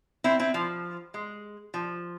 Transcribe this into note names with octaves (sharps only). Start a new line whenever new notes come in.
C4 E4
C4 E4
F3
G#3
F3